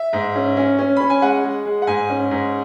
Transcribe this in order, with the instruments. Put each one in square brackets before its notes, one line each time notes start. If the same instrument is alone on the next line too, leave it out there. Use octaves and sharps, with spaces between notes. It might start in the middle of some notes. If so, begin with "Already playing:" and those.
Already playing: [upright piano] E5
G#2
C#4
C#4
C#4
C#4 B5
G#5
G#3 F#5
G#3
G#3
F#5
G#2 G#5
C#4
G#2